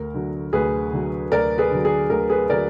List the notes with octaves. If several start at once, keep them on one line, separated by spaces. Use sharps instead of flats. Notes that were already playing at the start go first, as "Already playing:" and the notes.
Already playing: D2 A#4
D3 F#3
D2 G#4 B4
D3 F#3
D2 A#4 D5
G#4 B4
D3 F#3
G#4
D2 A#4
G#4 B4
D3 F#3 A#4 D5